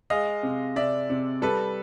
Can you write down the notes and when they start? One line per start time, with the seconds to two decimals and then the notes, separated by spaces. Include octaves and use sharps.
0.10 G#3 D#5 F5
0.43 C3
0.76 C3 D5 E5
1.10 C3
1.42 G3 A4 B4